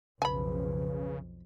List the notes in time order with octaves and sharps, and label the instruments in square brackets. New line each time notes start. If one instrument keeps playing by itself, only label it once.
[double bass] B1 F2 [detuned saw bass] C#3 [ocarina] B4 [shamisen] G#5 B5